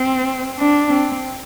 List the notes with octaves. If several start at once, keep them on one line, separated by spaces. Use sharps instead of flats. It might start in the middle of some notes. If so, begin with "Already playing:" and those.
Already playing: C4
D4
C4